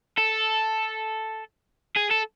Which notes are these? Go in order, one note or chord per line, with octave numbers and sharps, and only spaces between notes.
A4
G#4
A4